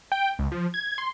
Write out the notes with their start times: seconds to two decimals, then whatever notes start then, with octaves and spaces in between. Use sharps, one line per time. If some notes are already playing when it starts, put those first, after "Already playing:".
0.12 G5
0.39 C#2
0.52 F3
0.74 G#6
0.98 C6